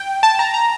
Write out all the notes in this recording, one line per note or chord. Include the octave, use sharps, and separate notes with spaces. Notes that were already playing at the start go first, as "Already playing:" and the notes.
Already playing: G5
A5
A#5
A#5